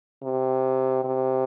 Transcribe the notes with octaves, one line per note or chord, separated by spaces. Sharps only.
C3
C3